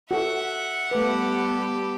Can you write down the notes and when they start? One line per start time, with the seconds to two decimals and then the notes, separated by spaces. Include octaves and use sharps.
0.11 F#4 A4 E5 F#5
0.91 G3 A3 B3 G4 A4 B4